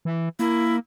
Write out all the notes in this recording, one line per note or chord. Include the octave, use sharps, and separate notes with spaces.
E3
A#3 E4